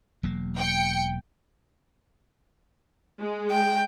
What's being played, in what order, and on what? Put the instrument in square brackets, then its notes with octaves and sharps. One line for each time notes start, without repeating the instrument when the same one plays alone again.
[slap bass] E1 F#3 A#3
[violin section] G5 C#7
[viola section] G#3
[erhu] G5